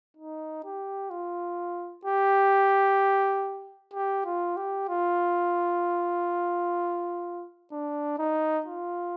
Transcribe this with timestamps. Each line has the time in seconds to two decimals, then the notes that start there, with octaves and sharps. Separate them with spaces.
0.17 D#4
0.64 G4
1.10 F4
2.05 G4
3.93 G4
4.25 F4
4.57 G4
4.89 F4
7.72 D4
8.18 D#4
8.66 F4